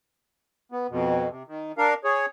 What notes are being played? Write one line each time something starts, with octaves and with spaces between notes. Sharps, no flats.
B3
F2 B2
C3
D#3
D4 A#4 F5
G#4 C#5